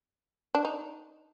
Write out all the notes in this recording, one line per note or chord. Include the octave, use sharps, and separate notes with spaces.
D4
D#4